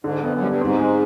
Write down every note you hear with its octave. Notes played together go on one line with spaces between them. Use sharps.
G#2 D3
F2 B3
F#2
G2 G3
G#2 C4
G#3